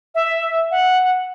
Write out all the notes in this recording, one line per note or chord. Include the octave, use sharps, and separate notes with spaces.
E5
F#5